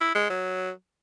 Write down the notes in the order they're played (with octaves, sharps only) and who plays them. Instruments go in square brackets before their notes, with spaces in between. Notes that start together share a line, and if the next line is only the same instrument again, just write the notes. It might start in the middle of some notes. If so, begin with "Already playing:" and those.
[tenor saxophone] E4
G#3
F#3